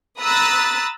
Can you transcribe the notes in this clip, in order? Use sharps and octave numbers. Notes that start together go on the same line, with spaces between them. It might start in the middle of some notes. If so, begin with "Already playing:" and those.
A#5 B5 D#6 E6 F#6 A6